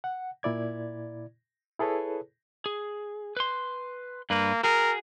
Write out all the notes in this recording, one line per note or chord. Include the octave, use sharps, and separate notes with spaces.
F#5
A#2 E4 D5 G#6
E4 G#4 A4 B4 C#5
G#4
B4 C6
G2 A#3 B4
F#4 G#4 A#4